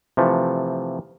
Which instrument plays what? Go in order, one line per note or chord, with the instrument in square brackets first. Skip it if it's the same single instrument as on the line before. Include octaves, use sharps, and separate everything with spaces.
[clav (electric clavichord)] C3 E3 F3 A3